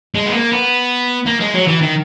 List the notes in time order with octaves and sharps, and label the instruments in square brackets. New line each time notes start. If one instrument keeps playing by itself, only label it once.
[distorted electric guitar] G#3
B3
A#3
B3
A#3
G#3
F#3
E3
D#3